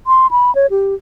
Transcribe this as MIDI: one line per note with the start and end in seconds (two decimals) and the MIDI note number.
0.07 0.27 84
0.31 0.54 83
0.55 0.66 73
0.70 0.95 67